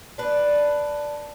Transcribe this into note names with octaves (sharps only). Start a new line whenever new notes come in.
D4 B4